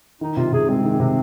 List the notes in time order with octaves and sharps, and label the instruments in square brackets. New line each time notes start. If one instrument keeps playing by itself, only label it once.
[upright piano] D#3 [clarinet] D#4
[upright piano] C3 [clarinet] F4
[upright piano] C3 [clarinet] G#4
[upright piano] G#3 [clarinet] C4
[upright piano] D#3
C3